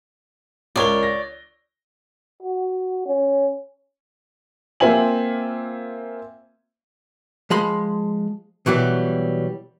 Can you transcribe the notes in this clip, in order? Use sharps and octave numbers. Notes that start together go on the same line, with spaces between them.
C#2 A#4 C#5 D5 G7
A#6
F#4
C#4
A#3 C4 F4 E5 G#5 F#7
F3 G#3 B5 C6
B2 E3 F#3 G3